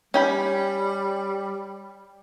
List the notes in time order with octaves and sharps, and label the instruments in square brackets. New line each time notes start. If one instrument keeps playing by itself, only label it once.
[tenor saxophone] G3 [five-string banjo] C#4 G5 B5